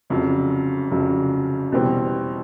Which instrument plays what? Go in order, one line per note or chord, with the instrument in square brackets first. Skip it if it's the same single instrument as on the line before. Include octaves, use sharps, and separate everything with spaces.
[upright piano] F1 F2 C#3 F#3
F1 F2 C#3 F#3
E2 B2 G3 C4